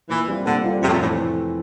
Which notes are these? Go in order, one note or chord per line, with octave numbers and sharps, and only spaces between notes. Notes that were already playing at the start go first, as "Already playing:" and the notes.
A#2 E3
G3 C4 F4
A#2 D3
G3 C4 F4
F1 C3
A2
A#2
A2 E3 A3 C4